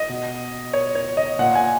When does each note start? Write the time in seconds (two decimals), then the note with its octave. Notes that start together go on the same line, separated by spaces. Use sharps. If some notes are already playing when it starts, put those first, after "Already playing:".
Already playing: D#5
0.09 B2
0.73 C#5
0.95 C#5
1.17 D#5
1.39 A#2 F#5
1.55 G#5